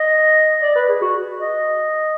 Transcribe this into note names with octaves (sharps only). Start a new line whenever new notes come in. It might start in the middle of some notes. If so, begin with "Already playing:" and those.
Already playing: D#5
D5
B4
G#4
F#4
D#5